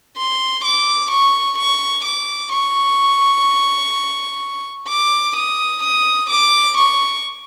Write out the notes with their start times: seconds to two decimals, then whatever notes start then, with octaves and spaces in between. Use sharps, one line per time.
0.17 C6
0.64 D6
1.11 C#6
1.58 C#6
2.05 D6
2.52 C#6
4.89 D6
5.36 D#6
5.83 D#6
6.30 D6
6.78 C#6